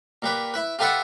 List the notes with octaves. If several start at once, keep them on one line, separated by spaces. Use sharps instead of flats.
A#2 G4 B4
E4 B4
F4 G4 A4 B4 E5 F#5